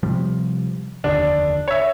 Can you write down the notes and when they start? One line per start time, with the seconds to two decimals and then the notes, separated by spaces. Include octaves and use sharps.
0.03 C3 F3 G3
1.04 F1 D#2 D3 D4
1.68 C#5 E5